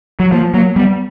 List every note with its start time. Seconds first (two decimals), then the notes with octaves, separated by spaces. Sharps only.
0.20 F#3
0.32 F3 A#3
0.53 F#3 A#3
0.76 G3 B3